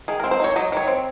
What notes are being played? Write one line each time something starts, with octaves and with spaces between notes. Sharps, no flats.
D#3 G#4
C4 A#4
C5
D#4 C#5
F#3 D#5
D#3 C#5
C4